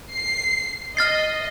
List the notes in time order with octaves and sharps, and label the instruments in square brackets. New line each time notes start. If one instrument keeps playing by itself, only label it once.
[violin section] C7
[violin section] D#5 [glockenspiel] F6 A6 C7